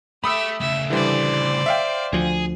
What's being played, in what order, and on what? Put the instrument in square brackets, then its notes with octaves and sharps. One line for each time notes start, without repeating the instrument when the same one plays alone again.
[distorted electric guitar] A3 [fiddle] G4 E5 [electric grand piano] B5 D#6 E6
[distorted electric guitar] C#3 A3 [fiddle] E5
[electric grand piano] D3 E3 G3 [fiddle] C5 D5
[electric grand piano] E5 F5 G5
[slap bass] D2 F3 [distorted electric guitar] G#4